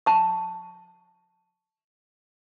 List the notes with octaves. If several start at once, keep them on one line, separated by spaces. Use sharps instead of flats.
A5 C#6